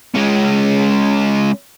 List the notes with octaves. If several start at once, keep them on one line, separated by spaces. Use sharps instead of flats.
G#3 C#4